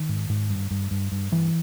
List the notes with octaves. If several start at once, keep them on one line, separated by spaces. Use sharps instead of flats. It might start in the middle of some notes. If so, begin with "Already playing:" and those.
Already playing: D#3
G#2
G#2
G2
G2
G2
G2
G2 E3